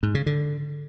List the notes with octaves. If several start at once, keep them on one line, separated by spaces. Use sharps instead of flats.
G#2
C#3
D3